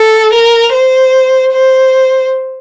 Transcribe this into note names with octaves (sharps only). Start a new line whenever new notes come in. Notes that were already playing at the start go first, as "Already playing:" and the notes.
Already playing: A4
A#4
C5
C5